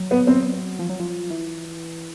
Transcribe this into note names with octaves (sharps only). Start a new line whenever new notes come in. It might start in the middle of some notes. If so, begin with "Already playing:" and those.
Already playing: F#3
B3
C4
F3
F#3
F3
E3